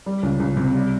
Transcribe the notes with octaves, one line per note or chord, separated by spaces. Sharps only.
G3
C#2
C#2
C3
G3